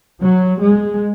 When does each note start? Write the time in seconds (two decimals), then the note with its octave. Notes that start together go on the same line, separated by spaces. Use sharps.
0.22 F#3
0.61 G#3